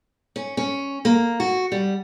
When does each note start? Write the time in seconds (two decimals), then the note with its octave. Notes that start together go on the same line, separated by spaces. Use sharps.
0.36 C#4
0.57 C#4
1.05 A#3
1.40 F#4
1.72 G3